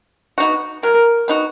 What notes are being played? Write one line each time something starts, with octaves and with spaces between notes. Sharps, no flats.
B3 D#4 F#4
F#3 A#4
B3 D#4 F#4